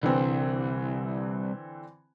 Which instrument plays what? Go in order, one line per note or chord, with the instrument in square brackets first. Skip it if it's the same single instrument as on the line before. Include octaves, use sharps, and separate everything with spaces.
[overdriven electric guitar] C2 [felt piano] D3 E3 C4